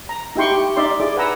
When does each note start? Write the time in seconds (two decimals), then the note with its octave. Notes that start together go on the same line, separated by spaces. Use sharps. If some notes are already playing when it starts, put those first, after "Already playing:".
0.09 A#5
0.36 D#4 E4 G4 G5 C6 C#6
0.51 G4
0.76 D#4 D5 E5 C6
1.00 E4 G#4 D5 D6
1.17 B4 F#5 G#5 A#5 E6